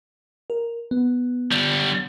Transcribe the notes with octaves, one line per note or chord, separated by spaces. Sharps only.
A#4
B3
D3 G3